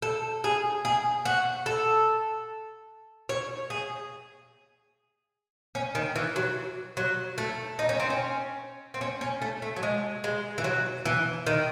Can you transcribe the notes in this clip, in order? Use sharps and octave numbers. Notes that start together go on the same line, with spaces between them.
A4
G#4
G#4
F#4
A4
C#5
G#4
C#4
D#3
E3
F#3
F#3
A3
D#4
C#4
C4
C#4
C4
C#4
C#4
A3
A3
F#3
G#3
G#3
E3
F#3
E3
D#3